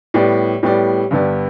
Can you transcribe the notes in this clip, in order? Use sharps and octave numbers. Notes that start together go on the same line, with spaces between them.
A2 G3 B3 G4 D5
A2 G3 B3 G4 D5
G2 D3 B3 G4 D5